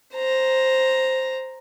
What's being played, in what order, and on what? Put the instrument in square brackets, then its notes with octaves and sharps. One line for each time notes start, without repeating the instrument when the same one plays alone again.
[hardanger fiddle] C5 A#5